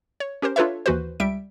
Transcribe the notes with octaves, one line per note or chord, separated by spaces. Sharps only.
C#5
C#4 G4 A#4 C5
D4 F4 A4 B4 C#5 E5
D#2 E3 F#4 B4 C5
C#2 G3 E5 D7